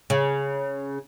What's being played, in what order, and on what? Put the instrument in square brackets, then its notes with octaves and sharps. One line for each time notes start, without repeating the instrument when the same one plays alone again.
[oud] C#3